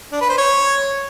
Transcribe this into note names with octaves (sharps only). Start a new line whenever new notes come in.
D4
B4
C5
C#5